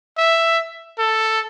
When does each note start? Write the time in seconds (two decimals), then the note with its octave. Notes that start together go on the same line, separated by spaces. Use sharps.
0.18 E5
0.99 A4